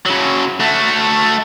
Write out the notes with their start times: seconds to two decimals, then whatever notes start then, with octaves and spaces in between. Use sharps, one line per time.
0.06 C#3 F#3
0.60 A3 F#4